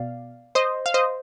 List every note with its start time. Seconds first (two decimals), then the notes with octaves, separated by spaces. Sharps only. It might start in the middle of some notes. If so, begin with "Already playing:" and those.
Already playing: B2 D5 F5
0.55 C5 D#5
0.86 F5
0.94 C5 D#5